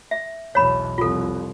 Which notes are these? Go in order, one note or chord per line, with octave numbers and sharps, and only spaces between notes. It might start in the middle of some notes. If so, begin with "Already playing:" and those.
E5
B1 E2 C#5 B5
C2 F2 F4 A4